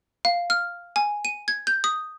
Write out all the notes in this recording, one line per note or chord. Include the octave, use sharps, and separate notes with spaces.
F5
F6
G#5
D#7
G#6
G6
D#6